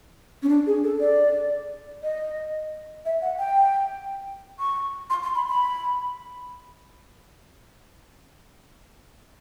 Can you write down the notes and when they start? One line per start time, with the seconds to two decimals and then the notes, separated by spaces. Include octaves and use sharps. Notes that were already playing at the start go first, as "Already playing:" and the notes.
0.43 C#4
0.49 D4
0.67 G#4
0.84 A4
1.00 D5
2.03 D#5
3.05 E5
3.22 F#5
3.39 G5
4.59 C#6
5.10 C6
5.23 C6
5.35 B5
5.49 B5